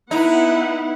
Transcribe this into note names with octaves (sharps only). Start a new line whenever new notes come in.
B3 D#4 E4 F#5